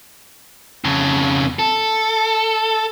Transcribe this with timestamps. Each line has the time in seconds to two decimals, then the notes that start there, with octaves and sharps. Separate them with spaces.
0.85 F2 C#3
1.59 A4